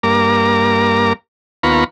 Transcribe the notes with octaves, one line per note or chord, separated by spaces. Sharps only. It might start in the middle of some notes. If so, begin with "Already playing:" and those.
G2 A#3 A#5 D6
D#2 B3 F4 A#5 B5 C#6